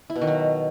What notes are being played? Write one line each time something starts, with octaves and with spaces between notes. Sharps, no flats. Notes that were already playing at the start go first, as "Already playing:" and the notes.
E4
B2
D#3
F#3